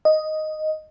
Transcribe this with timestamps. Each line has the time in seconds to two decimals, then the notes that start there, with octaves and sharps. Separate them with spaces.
0.05 D#5